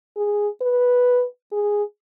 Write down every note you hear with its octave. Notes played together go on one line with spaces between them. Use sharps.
G#4
B4
G#4